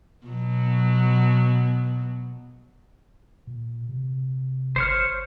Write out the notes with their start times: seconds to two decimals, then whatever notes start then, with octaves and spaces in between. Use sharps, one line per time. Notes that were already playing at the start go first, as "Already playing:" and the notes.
0.26 B2 F#3
3.47 A#2
3.89 C3
4.76 G#1 C5 C#5 F6